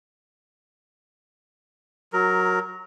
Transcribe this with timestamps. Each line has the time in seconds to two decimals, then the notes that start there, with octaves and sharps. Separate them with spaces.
2.13 F#3 A#4